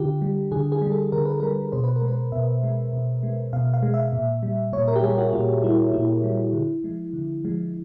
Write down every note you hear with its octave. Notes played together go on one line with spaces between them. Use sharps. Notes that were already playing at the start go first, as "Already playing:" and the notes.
Already playing: D3 F4 G4
G3
D3 G#4
G#4
G3
A4
D3 A#4
B4
G3 A#4
B2 C5
B4
A#4
G#3
B4
B2 E5
G#3
B2
G#3
B2 F5
F5
G#3
E5
A#2
G3
A#2 C#5
A#4
G4
G3 G#4
F#4
A#2 F4
G3 E4
A#2 E4
G3
D3
F3 G#3
D3
F3 G#3